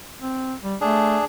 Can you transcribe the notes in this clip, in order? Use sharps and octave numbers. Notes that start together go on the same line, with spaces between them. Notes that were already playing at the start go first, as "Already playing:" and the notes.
C4
G3
A3 D4 G#4